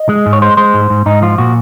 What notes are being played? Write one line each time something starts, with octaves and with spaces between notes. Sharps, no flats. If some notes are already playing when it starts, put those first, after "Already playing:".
Already playing: D#5
G#3
G#2
C#5
G#3 C5
G#3 C5
G#2
G#2
G#2 D#4
F3 F4
A#2 F#4